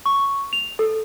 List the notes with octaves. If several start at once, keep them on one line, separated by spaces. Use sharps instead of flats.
C#6
F7
A4